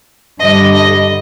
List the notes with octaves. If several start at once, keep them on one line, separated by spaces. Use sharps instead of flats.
G2 D3 G3 D#5
D#5